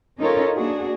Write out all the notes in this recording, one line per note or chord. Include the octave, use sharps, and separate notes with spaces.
C#4 D#4 F4 A4 A#4 C#5
A#3 D4 F#4 G#4